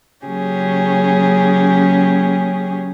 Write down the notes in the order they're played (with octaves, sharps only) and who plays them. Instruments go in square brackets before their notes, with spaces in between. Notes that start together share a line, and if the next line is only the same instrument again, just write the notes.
[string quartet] C#3 F#3 A#3 C#4 G4 G#4